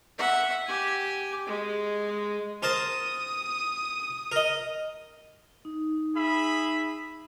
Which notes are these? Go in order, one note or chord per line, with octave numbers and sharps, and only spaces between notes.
E5 F#5
G4 G#5
G#3
A#4 C5 A5 D#6
A#4 D#5
D#4
G#4 E5 B5